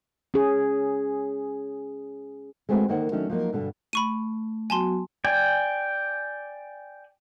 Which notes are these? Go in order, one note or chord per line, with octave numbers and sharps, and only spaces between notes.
C#4 G#4
G#3 A3 C4 F#4 B4
D3 D#3 A#3 C5 F#5
D#3 F#3 A3 C#4 D4
F3 F#3 A#3 D#4
G2 B2 D3
A3 B5 C#6 D#7
F#3 B3 F#4 G#5 A5 C6
D5 G5 G#5